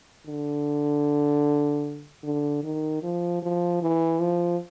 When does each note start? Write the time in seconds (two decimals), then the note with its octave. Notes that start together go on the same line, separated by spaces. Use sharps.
0.26 D3
2.24 D3
2.63 D#3
3.03 F3
3.42 F3
3.82 E3
4.21 F3